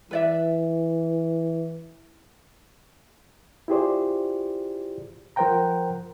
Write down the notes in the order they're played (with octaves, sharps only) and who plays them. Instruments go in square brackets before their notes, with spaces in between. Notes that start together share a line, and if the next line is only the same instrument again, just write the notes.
[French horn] E3 [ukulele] B4 D5 E5
[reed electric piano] E4 F4 G4 G#4 C5 D5
F3 A#4 C5 F#5 G5 A#5